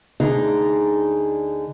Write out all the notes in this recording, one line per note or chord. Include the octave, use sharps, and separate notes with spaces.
D2 D3 D#4 G#4